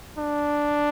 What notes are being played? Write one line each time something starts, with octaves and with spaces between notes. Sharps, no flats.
D4